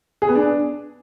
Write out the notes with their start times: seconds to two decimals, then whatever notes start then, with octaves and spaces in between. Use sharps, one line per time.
0.22 G#4
0.29 B3
0.35 D4